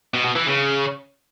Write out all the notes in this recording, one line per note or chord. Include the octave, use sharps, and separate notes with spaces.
B2
B2
E3
C#3